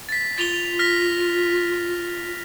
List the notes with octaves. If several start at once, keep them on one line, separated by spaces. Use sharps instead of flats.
A6 B6
F4 A6 F7 G7
F6 A#6 B6